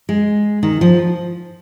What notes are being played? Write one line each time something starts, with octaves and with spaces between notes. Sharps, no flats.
G#3
D#3
F3